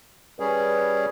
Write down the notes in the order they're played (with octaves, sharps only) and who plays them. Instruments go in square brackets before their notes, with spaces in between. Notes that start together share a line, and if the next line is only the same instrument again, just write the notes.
[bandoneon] G3 C#4 G#4 [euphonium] B4